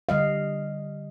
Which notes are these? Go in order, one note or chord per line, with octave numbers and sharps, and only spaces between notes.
D3 G3 D#5 F5